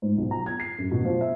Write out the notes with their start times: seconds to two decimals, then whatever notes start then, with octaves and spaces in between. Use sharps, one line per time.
0.02 G#2
0.18 B1
0.31 A#5
0.46 G#6
0.60 C7
0.78 F#2
0.91 B2
1.05 F3
1.21 E5